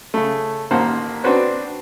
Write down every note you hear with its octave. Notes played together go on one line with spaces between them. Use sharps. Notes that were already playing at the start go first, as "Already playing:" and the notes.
C#3 A3
A1 D#3 A#3 C5 F#5 A5
C4 D4 F#4 B4 C5